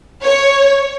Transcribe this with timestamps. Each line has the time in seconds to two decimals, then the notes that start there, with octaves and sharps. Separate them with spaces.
0.24 C#5